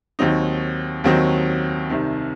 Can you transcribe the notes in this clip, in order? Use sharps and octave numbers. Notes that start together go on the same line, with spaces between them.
D#2 D#3 F#3 C4 D#4
D#2 D#3 F#3 C4 D#4
C2 C3 D#3